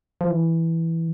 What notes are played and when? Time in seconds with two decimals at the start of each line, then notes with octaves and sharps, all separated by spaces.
0.21 F3
0.30 E3